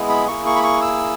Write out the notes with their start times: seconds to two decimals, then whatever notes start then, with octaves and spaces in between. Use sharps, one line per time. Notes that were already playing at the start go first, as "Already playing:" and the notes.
Already playing: G#3 B3 E4 G#4
0.09 B5
0.27 A#3 E4 G#4 C#6
0.46 C#6
0.56 B5
0.64 C#6
0.82 E6